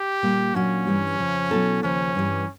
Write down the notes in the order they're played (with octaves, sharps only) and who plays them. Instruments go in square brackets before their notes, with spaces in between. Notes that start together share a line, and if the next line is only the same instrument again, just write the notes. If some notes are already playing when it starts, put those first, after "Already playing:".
Already playing: [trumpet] G4
[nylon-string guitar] A#2 G3 A#3
[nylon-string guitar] A#2 F#3 A#3 D4 F#4 [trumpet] C#4
[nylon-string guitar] G2 E3 G3
F2 C#3 F3
B2 F#3 B3 E4 A4
[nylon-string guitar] D#2 C#3 F3 [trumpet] C#4
[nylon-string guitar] G2 E3 G3